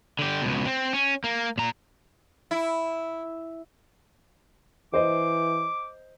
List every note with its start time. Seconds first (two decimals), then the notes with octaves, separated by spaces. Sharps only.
0.19 D3 G4
0.42 C#2 B2
0.65 C4
0.93 C#4
1.24 A#3
1.58 A#2 A#5
2.51 E4
4.94 E3 C5 D#5 D6